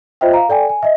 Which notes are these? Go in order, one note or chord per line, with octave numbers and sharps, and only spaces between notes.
F4 C5 D#5 E5 G5
F5 A#5
A4 D5 G5 G#5
G#5
D#5 E5